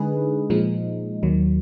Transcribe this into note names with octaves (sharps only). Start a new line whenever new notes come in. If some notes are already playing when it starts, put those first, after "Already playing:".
Already playing: D3 G#3 D#4 G#4 B4
A#2 F3 G#3 D#4
D#2 D#3 F#3